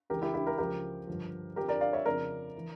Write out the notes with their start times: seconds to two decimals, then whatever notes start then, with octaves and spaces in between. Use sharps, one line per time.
0.10 C#2 C#3 E3 G4 A#4
0.22 E4 G4
0.34 E4 G4
0.47 G4 A#4
0.58 C#2 C#3 F3 G4 A#4
1.07 G2 D3 F3
1.56 F2 D3 F3 G4 A#4
1.68 A#4 D5
1.81 D5 F5
1.93 C#5 E5
2.06 F2 C#3 F3 A#4 D5
2.57 E3